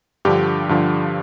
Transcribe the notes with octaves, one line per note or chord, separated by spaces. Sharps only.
G2 D3 F3 G4
G2 D3 F3